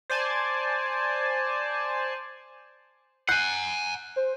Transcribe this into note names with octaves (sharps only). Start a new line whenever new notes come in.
C5 D5 G#5 A5
F#5 G#5 F#6 G6 C7
C5